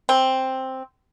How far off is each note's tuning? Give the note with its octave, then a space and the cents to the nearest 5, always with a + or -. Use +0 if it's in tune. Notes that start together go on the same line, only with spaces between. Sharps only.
C4 +5